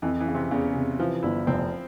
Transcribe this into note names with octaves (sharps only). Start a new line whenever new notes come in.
F2 E3
E3
F2 C#3
C3
E2 C#3
C3
E3 F3
G1 E4
F1 C4